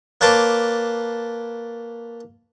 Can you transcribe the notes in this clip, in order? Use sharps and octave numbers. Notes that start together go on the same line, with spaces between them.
A#3 B4 C#5 A5 C6 D6